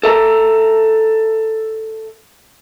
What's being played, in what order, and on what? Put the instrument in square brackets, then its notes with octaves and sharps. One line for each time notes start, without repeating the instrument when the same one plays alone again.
[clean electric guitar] A4 E5 A#5